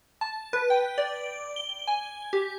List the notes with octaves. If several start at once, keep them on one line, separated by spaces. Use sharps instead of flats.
A5
B4
G5
D5
G7
G#5
G4